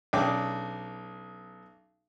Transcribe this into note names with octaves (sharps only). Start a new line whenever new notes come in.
B1 C#4 D4 G#4 G5 D6